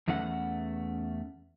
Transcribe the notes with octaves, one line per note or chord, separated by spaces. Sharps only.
E2 E3 A3 C#4 F#5